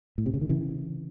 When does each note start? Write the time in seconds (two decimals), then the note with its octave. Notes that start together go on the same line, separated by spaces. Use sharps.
0.18 A2
0.26 C3
0.34 C#3
0.41 D#3
0.49 C#3 E3